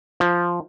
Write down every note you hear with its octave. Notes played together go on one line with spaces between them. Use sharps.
F3